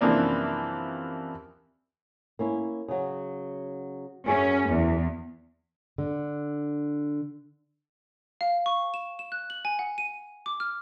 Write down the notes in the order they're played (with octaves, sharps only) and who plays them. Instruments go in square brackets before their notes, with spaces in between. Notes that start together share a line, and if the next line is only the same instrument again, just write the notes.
[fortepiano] F#2 C3 E3 F3 A#3 D4
[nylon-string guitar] A#3 C#4 E4
C#3 F#3
[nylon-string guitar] F#2 G#4 E5 [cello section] C#4
[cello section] E2
[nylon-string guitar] D3
[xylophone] F5
C#6
E7
E7
F#6
F#7
G#5
F#5
D#7
D6
F6